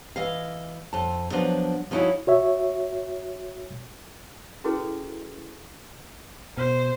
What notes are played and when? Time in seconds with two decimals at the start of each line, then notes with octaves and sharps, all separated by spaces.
0.16 E3 D#5 F5
0.93 F2 A5
1.31 F3 F#3 B3 D4
1.91 F3 B3 C#4 D#4 E4 F#4
2.27 F#4 C#5 E5
4.64 C#4 E4 F#4 G#4 A4 B4
6.57 B2 C5